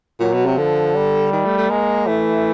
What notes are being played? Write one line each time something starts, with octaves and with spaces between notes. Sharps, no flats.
A#2 F#3
B2
C3
D3 F3
G3
D#3
A3
A3
G#3 A#3
E3 A3